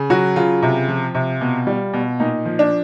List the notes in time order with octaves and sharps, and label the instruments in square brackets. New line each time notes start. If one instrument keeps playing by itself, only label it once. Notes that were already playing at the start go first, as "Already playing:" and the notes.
Already playing: [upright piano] C#3
F#3 F#4
C#3 F4
C3
F3
C3
B2
G3
B2
A#2 D#4
F3
D4